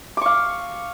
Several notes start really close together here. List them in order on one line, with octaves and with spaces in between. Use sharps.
D6 C#6 F5